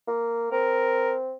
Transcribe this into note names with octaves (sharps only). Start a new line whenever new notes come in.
A#3
C4 A#4